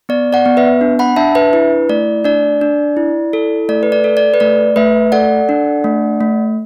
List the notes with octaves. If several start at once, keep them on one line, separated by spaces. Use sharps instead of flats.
B3 D5
D5 F#5
B3
B4 E5
D4
F#5 B5
D4 E5 A5
B4 E5
E4 B4
A3 D5
D4 D5
D4
E4
A4
A3 D5
B4
D5
A4
D5
B4
A3 D5
A3 B4 E5
A4 D5 F#5
D4
A3
A3